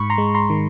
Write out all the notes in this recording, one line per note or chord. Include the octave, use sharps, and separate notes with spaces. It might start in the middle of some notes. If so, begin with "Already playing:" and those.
Already playing: G#2 B5 C#6
A#5 C6
G#3
A#5 C6
D#3